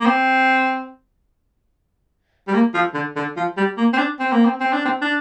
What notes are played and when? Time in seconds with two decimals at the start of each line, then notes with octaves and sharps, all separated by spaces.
0.01 A#3
0.06 C4
2.48 G3
2.54 A#3
2.74 F3
2.94 D3
3.16 D3
3.37 F3
3.57 G3
3.77 A#3
3.93 C4
3.98 D4
4.19 C4
4.32 A#3
4.45 C4
4.60 C4
4.73 D4
4.85 C4
5.02 D4